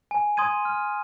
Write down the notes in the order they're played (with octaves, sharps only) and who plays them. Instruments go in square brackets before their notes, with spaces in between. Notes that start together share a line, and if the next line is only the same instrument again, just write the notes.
[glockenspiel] G#5
C6 D#6 G#6 D#7
F6